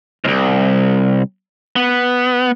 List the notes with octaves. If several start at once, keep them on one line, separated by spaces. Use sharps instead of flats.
C2 G#2
B3